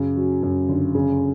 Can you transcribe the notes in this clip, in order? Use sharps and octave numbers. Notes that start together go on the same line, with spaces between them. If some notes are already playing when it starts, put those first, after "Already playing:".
Already playing: F#2 C#3
F#3
F#2
G1
C#3